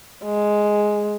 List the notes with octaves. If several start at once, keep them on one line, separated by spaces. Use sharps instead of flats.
G#3